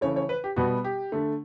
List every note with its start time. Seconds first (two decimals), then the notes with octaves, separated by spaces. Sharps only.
0.01 C#3 E3 A3 C#5
0.16 C#5
0.29 B4
0.44 G4
0.56 B2 G3 B3 F#4
0.84 G4
1.12 D3 A3